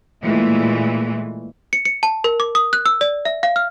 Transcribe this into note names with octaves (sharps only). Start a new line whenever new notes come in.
A#2 E3 G#3 A3
C#7
C#7
A5
A#4
D6
D#6
F#6
E6
D5
E5
F5
F6